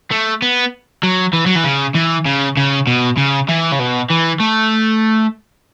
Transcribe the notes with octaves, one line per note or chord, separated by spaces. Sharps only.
A3
B3
F#3
E3
F#3
E3
C#3
E3
C#3
C#3
B2
C#3
E3
C#3
B2
E3
A3